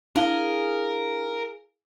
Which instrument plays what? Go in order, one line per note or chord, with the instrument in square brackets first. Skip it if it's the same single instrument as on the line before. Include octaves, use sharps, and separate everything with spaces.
[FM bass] D4 [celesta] E4 F5 G7 [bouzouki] G#4 [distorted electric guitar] A#4